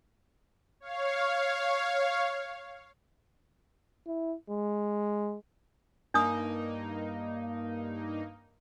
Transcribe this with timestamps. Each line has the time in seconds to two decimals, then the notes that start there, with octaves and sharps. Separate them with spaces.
0.80 C#5 F5
4.07 E4
4.50 G#3
6.14 G2 A#3 D4 D#4 D#6